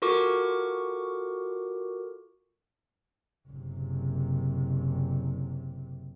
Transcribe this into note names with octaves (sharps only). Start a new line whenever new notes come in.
F4 F#4 A4 A#4 C#6 D6
F#1 C3